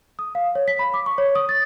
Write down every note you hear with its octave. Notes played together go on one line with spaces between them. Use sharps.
D#6
F5
C#5
B6
B5
D6
C#6
C#5
D#6
A6